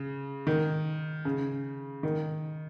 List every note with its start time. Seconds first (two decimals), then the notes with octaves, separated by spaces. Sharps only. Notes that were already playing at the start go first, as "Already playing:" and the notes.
Already playing: C#3
0.47 D#3
1.25 C#3
2.03 D#3